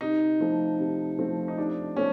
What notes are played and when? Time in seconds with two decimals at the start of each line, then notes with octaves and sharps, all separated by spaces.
0.01 C3 D#4
0.40 F3 A3 C4
0.79 C3
1.19 F3 A3 C4
1.48 D#4
1.58 C3 D4
1.96 F3 A3 C4 C#4